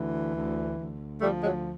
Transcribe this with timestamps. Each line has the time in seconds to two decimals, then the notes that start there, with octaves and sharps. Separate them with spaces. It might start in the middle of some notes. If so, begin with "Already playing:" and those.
Already playing: D2 E3
0.35 D2
0.78 D2
1.21 F3 G3 A3
1.44 F#3 G#3